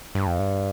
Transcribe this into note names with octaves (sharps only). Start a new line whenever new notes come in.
G2
F2
G2